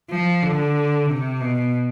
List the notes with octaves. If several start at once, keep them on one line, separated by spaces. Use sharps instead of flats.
F3
D3
C3
B2